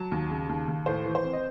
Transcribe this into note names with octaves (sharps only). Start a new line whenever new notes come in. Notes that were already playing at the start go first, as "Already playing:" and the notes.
Already playing: F#3 A5
D#2
C#3
D#2
D#2
A2 C5
E3
C5
C4
D#5